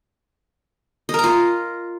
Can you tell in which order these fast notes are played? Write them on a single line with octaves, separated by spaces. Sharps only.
D#5 A#4 A#5 F4